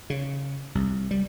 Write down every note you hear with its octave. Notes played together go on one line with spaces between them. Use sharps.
C#3
C2
G3